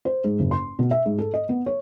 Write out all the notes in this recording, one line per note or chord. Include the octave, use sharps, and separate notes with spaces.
C5
G#2
F#1
C6
B2
E5
G#2
A4
D#5
B3
C#5